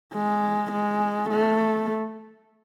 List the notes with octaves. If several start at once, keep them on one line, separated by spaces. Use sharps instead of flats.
G#3
G#3
A3